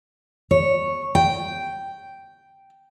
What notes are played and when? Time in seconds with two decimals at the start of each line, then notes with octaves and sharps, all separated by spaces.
0.51 C#5
1.15 G5